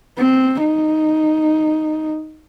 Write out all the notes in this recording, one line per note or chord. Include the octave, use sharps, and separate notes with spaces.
C4
D#4